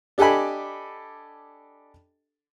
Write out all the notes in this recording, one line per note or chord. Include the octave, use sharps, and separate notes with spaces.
D4 G4 A4 D#5 G#5 B5